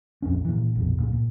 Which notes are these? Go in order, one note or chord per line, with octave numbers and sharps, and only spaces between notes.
A#1 F2 C4 C#4
A#2 E3
A#1 F2 B2
C#2 A#2
A#2